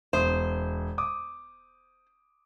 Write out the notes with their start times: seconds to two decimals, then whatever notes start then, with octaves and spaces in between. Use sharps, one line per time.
0.13 E1 C5 D#6
0.98 D6 D#6